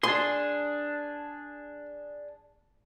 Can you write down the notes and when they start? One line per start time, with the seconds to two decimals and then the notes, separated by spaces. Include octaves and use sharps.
0.03 D4 G#4 C6